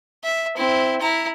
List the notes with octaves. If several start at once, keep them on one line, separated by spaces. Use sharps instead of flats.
E5
C4 E4
E4 A#5